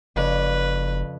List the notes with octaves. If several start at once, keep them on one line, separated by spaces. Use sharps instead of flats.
F#1 F2 C#3 B4 D5